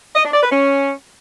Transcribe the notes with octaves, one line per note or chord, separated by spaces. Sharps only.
D#5
D4
D5
B4
C#4